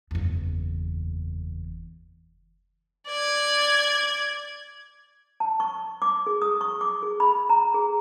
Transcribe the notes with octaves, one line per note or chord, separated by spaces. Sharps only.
F#1 E2
D5 G#6
A5
C#6
D6
G#4
D#6
C#6
D6
G#4
B5
A#5
G#4